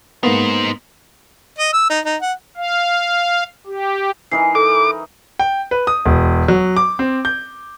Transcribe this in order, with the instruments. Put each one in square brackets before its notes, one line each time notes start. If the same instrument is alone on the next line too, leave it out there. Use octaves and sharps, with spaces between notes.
[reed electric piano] G#2 A#3 B3 [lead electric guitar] D#4 C5
[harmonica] D#5
E6
D#4
D#4
F#5
[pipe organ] F5
G4
[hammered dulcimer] E3 D#4 A#4 [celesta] C7
[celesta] A4 [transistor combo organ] D6
[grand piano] G5
B4
D#6
E1
F#3
D6
C4
G6